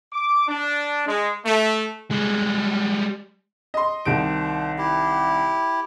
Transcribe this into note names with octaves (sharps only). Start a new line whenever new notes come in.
D6
D4
G#3
A3
G3 G#3
D#5 C6
C2 D#3 D4 C5 D7
E4 G4